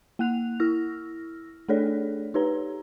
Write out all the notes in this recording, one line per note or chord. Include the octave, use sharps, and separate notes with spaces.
A#3 F#5 F#6 F7
E4 E6 F6 A#6
A3 D4 G#4 A4 C#5 D5
D#4 G4 B4 C#5 A#5